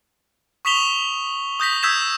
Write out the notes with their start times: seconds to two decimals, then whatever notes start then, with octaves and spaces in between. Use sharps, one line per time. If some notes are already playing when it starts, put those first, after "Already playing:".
0.65 C#6 D#6 B6 E7 F7 G7
1.60 D#6 G6 A#6 B6
1.83 D#6 E6 G6 G#6 B6 E7